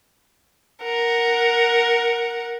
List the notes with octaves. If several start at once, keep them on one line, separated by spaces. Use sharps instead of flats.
A#4 F#5